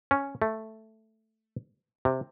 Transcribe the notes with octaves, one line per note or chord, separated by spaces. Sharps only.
C#4
A3
C3